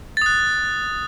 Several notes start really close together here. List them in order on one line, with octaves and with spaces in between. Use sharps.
A6 D#6 F#6